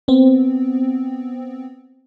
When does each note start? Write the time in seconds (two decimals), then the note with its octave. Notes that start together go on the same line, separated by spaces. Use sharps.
0.08 B3 C4